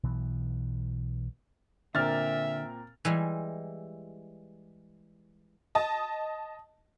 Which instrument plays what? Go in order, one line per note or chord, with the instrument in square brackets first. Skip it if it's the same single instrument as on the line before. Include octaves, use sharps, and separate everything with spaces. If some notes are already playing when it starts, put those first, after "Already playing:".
[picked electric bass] B1 B2 E3
[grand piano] A#2 C4 A#4 [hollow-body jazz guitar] D3 [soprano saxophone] E5 [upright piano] F6 A6
[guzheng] E3 G3 G#3
[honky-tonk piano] D#5 A5 D#6